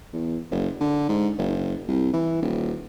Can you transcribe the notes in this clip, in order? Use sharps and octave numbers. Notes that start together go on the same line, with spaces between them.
E2
F#1
D3
G#2
F#1
C2
E3
D#1